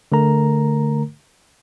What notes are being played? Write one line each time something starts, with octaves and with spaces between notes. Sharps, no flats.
D3 A3 A#4 A#5